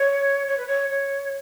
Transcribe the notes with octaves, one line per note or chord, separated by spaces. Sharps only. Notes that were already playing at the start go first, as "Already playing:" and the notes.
Already playing: C#5
C#5
B4
C#5
C#5